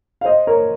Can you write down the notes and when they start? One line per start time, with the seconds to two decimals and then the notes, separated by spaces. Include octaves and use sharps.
0.21 F5
0.25 C5 D#5
0.47 A#4 C#5